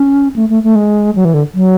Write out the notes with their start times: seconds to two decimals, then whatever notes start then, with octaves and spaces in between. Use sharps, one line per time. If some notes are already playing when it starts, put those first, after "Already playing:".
Already playing: C#4
0.36 A3
0.49 A3
0.63 A3
0.75 G#3
1.15 F#3
1.25 E3
1.34 D3
1.54 F#3